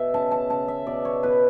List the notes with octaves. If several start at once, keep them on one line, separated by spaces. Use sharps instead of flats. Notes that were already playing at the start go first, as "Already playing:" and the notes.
Already playing: B2 E5
C#3 A5
A5
C#3 A5
E5
B2 D5
C#5
B2 B4